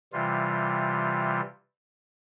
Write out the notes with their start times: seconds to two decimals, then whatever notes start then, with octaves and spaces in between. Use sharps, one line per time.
0.13 C3 E3 G3 F4